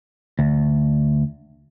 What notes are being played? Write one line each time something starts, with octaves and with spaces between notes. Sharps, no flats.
D2